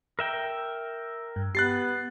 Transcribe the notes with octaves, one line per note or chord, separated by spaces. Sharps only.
A#4 E5 G5
G2
B3 G4 F#6 A6 C7